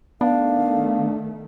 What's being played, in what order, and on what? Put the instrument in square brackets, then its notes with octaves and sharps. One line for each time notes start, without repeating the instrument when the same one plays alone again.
[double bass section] D#3 A3 [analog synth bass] B3 [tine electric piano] D4 [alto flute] F5